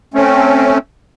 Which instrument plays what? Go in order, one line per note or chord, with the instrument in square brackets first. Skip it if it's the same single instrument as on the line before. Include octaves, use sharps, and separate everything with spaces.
[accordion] A3 C4 C#4